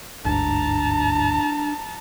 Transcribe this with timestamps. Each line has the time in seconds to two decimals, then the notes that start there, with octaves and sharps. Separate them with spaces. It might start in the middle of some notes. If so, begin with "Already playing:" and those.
0.25 G1 D2 G#2 D4 A5 A#5